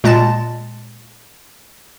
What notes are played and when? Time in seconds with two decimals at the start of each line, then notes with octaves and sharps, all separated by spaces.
0.04 A#2 G#3 A5 A6